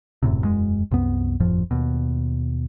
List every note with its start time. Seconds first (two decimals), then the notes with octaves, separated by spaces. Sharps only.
0.23 E1 F#2 A2 C3
0.42 E1 F#2 G#3
0.91 C2 F#2 B3
1.40 G1 F2 A2 F3
1.71 D#2 B2